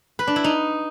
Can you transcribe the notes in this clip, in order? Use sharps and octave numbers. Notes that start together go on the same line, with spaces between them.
B4
D4
E4
D#4